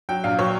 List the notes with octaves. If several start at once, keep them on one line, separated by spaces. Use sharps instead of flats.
F#3 G5
A#1 F5
F#3 C#5